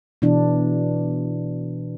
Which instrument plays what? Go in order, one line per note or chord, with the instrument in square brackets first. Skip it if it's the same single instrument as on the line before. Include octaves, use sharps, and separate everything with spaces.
[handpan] B2 E3 D4